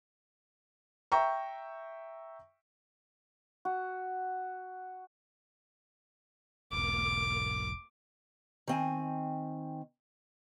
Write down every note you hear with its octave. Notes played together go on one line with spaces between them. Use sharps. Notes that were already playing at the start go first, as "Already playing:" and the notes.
E5 G5 A#5 C#6
F#4
E1 B1 D6
D#3 C4 G#5